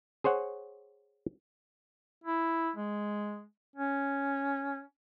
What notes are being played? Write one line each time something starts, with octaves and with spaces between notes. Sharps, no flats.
G#4 C5 C#5 F#5
E4
G#3
C#4